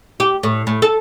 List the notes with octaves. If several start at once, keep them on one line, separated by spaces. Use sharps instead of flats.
G4
A2
A2
A4